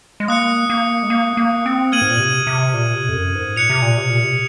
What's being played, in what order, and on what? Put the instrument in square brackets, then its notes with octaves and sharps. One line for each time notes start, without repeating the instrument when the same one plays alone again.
[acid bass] G#3
[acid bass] A#3 [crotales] D#6 F#6 C#7
[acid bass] A#3
G#3
A#3
A#3
C4
[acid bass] A#3 [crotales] F6 G#6 D#7 F#7
[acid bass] G#2
A#2
C3
C3
A#2
C3
F2
F#2
G#2
[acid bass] A#2 [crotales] F#6 C#7 F7
[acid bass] C3
A#2
C3
A#2
C3